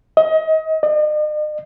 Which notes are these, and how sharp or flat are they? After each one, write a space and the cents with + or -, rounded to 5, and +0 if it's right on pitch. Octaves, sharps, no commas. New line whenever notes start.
D#5 +30
D#5 -45